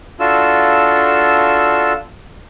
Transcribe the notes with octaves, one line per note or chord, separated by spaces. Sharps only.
D4 F4 F#4 A4 E6